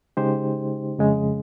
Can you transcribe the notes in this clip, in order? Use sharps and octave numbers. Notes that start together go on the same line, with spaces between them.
C#3 G#3 D#4 G4 C5
F2 C#3 G#3